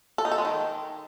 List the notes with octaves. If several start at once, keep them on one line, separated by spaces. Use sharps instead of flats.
A4
D#4
A4
G#3
D#3